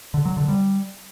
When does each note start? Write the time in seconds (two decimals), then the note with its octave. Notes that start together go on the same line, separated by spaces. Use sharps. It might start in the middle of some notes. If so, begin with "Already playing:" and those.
0.14 D3
0.25 F#3
0.37 D3
0.48 G3